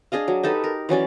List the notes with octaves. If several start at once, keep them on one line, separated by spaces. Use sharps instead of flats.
D4 G#4 D#5 F5
F#3
D#4 G4 A4 B4
A#4
E3 F#3 C#4 D5